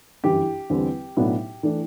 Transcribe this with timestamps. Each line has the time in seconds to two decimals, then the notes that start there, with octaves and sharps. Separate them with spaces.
0.24 G1 F#2 E3 G4
0.70 E2 D3 G3 C4
1.17 B1 A2 F#3 B3 D4
1.63 E3 A3 D4